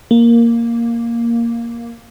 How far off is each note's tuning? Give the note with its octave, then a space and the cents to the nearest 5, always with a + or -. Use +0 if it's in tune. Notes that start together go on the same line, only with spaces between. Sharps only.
A#3 +0